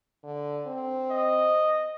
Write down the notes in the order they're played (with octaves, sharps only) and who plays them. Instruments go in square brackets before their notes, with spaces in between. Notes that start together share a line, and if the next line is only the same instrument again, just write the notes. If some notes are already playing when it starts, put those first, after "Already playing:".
[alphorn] D3
C4
[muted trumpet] D#5